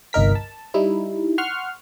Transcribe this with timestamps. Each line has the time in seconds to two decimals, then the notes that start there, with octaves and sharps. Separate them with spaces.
0.13 G1 C2 D#4 A#4 B6
0.35 A5
0.74 G3 D#4 E4
1.38 F#5 C6 C#6 F6